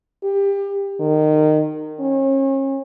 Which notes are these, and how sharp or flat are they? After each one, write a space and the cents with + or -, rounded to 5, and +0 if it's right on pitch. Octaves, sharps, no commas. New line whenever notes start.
G4 +25
D#3 -20
C#4 -40